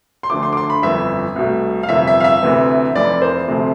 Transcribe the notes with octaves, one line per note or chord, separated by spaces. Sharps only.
C6
D2 D3 F3 A3 D6
C6
D6
C6
B5
G1 F2 E3 E5
C2 B2 A3
F5
G1 F2 C3 E5
E5
F5
E5
D2 C3 E3 B3
F1 F2 E3 D5
C5
D2 C3 F3 A3